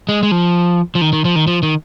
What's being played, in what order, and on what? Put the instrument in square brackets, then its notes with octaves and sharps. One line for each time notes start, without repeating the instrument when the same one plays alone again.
[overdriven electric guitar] G#3
G#3
F3
F3
D#3
D#3
F3
D#3
F3
D#3